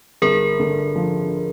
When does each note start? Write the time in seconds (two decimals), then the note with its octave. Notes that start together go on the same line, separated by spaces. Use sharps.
0.22 G1 G#4 A#4
0.60 D3
0.96 F3